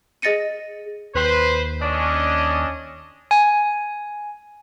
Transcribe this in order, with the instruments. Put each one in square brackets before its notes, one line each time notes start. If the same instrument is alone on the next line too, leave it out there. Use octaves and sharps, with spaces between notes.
[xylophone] G#4 D#5 A6 A#6 C#7 D#7
[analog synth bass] D#2 [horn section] B4 C5
[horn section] C#4 D4 D#5
[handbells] G#5